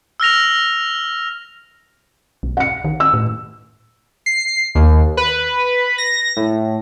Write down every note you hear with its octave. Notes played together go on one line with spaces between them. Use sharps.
E6 F6 A#6 F7
B1
F#5 C#7
D#3
E6
A2
C7
D#2
B4
A#6
A2